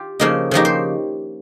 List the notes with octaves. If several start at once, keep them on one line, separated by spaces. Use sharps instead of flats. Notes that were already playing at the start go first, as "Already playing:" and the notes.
Already playing: F4 G4
C#3 F3 A#3 D#4
C#3 F3 A#3 D#4 G4
C5